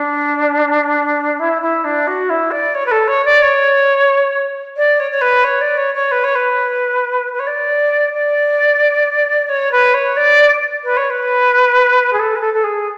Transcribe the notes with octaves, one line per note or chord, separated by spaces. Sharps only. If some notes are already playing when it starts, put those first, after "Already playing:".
Already playing: D4
E4
E4
D4
F#4
E4
D5
C#5
B4
A4
C#5
D5
C#5
D5
C#5
C#5
B4
C#5
D5
C#5
C#5
B4
C#5
B4
B4
C#5
D5
D5
C#5
B4
C#5
D5
B4
C#5
B4
G#4
A4
B4
A4
A4
G#4